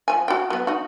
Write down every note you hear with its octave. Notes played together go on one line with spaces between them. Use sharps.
F3 C#5 G#5
F#4 G5
F#3 B3
D#4 F#4